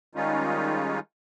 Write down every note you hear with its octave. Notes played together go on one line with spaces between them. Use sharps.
D#3 G3 G#3 C#4 D#4 F4